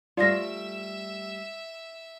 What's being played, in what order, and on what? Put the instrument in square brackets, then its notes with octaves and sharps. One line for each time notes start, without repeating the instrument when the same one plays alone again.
[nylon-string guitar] G3 A3 [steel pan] F4 [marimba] D5 A#6 [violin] E5 E6